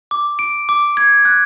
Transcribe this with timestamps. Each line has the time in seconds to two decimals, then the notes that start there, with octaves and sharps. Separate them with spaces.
0.11 D6
0.39 D7
0.69 D6
0.97 G#6
1.25 F#6